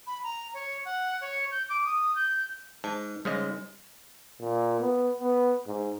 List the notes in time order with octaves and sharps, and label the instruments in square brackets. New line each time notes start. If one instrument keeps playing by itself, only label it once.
[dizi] B5
A#5
C#5
F#5
C#5
G6
D6
D#6
G6
[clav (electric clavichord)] G#2 [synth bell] A5
[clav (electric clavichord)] G#2 C#3 D#5 [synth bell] G3
[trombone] A#2
B3
B3
G#2